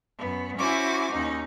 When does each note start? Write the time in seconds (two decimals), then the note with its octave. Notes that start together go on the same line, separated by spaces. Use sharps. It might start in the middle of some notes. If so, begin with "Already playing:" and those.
0.18 F#2 B3
0.58 C#4 E4 F#4 C5 G#5 D6
1.12 D#2 C#4 D#4